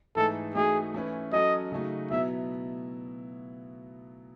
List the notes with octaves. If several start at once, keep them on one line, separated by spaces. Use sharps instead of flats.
G#2 E3 A3 D#4 G#4 A4
E3 A3 D#4 F#4 G#4
E3 A3 C#4 E4 B4
F#3 C#4 F#4 A4 D#5
C#3 F#3 A3 D#4 F#4
B2 F#3 B3 E4 E5